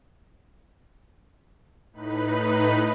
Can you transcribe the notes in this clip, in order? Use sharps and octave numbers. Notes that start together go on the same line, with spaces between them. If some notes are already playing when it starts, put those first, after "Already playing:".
A2 D#4 B4 B5